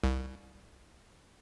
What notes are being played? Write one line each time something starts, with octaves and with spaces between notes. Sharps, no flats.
C2